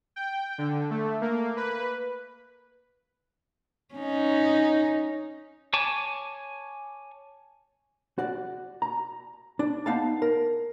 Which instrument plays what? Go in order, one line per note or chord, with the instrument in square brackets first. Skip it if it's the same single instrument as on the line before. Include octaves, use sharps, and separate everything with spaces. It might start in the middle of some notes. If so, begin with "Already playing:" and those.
[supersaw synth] G5
D3
A3
A#3
B4
[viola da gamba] C#4 D#4
[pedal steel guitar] C#5 G#5 A5 C#6 D6
[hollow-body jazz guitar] F#4 D5
A#5
D4
B3 D#4 F5 F#5 A5
A#4